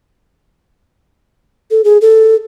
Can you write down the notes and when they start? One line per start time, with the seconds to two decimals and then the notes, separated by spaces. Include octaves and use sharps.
1.71 A4
1.84 G#4
2.01 A4